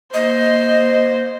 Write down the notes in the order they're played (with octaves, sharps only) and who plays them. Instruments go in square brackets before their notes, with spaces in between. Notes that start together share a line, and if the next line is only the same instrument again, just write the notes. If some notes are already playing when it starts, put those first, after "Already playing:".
[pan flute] A#3 [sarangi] C5 [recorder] D#5